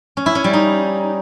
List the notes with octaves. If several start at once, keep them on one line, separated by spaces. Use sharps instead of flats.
C#4
E4
C#4
G3
D#4